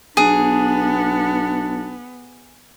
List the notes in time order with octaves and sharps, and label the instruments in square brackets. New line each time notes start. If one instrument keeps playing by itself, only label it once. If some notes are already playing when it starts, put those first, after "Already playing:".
[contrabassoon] B1 [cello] B3 [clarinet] D4 [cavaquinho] G#4